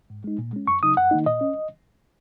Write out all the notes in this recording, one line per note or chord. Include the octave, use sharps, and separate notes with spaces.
G#2
G#3 D#4
A#2
G#3 C#4
F#2 C#6
C#3 F#3 D#4 D#6
F#2 F#5
D#3 A#3 D#4
A#2 D#5
C#4